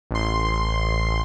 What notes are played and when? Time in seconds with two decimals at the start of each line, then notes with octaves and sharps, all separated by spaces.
0.11 A1 C6